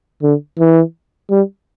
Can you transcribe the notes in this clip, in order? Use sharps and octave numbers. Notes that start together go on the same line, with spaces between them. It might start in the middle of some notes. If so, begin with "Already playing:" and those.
D3
E3
G3